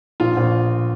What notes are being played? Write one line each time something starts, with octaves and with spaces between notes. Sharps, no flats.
A#1 F4
A#1